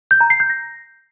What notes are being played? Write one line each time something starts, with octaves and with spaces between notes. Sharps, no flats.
G6
A#5
C7
G6
A#6